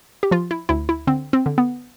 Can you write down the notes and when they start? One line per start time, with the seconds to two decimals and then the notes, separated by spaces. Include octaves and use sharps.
0.23 G4
0.31 F3 F4
0.51 E4
0.69 D2 E4
0.89 E4
1.07 D3 C4
1.33 C4
1.46 D3
1.58 B3